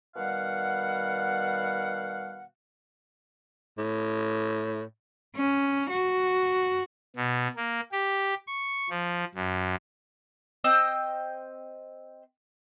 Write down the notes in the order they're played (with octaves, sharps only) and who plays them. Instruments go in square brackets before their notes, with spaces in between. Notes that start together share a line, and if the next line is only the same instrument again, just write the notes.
[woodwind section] B2 D#3 G3 F5 F#5
[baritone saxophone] A2
[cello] C#4
F#4
[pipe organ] B2
A#3
G4
C#6
F3
F#2
[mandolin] C4 D#5 G5 E6